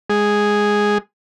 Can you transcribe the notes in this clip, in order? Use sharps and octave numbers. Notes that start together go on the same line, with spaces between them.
G#3 G#4